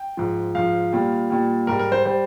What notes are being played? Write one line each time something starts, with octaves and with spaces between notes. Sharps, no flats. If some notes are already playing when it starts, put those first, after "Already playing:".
Already playing: G5
G#2 F3
G#2 F3 F5
A#2 G3
A#2 G3
G#2 G3 A#4
A#4
C5
G3 C5